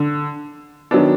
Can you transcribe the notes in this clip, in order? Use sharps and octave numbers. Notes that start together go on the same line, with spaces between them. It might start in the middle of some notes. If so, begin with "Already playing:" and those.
Already playing: D3
D#3 F#3 B3 D4